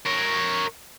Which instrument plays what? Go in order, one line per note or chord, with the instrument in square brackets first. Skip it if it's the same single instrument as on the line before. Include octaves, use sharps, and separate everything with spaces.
[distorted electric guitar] A#4 C#5